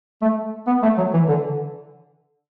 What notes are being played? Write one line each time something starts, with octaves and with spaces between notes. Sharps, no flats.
A3
B3
A3
F#3
E3
D3